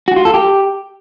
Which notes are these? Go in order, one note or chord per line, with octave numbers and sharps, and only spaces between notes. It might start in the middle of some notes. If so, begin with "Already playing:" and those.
F#4
F4
A4
G4